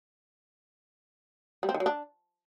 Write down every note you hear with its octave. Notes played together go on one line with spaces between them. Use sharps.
G3
C4
D#3
F#3
D4